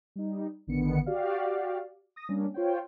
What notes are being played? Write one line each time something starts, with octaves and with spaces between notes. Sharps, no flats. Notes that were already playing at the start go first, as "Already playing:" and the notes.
G3 D#4
A1 D3 D#3 B3 C#7
F#4 G4 D5 F5
D#6 A#6
G3 A#3 C#4 D4
F4 C5 C#5 G5